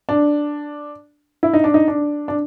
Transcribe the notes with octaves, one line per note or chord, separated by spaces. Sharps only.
D4
E4
D#4
D4
D#4
D4
D4